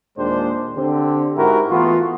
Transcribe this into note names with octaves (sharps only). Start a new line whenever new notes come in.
D#2 A#2 G#3 D4 G4 C5
D3 C4 G4
G#2 E4 F#4 G4 A#4
E3 A3 B3 F4 F#4